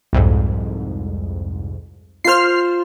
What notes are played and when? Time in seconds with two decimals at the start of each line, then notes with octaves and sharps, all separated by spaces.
0.13 C2 F2 G#2
2.24 F4 C5 F6 C7